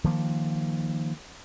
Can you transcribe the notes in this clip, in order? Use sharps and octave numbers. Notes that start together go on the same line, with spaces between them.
D#3 F3 A#3